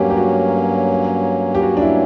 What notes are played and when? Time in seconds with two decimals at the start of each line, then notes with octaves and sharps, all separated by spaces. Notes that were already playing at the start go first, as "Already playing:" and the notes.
Already playing: G2 F#3 A#3 C#4 G4 A#4
0.10 G4
0.17 F#4
1.55 G4
1.63 F#4
1.77 D4
1.82 E4